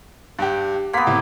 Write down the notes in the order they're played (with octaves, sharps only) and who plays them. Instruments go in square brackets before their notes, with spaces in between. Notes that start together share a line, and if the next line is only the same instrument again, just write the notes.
[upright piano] G2 G4
[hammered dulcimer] A#3 B3 [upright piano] F#5 C6 B6
[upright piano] A2 C3